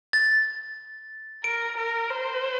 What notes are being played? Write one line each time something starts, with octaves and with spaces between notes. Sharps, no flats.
A6
A#4 D7
A#4
C5